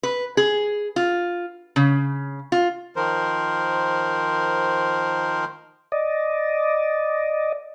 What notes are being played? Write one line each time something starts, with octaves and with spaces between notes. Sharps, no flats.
B4
G#4
F4
C#3
F4
D#3 F3 A#4 C5
D5 D#5